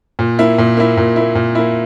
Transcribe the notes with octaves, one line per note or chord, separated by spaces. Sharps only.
A#2
A#3 E4
A#2
A#3 E4
A#2
A#3 E4
A#2
A#3 E4